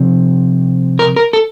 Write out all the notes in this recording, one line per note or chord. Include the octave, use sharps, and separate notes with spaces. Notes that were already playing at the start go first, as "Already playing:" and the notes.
Already playing: C3 F3 C4
A#4
A#4
A4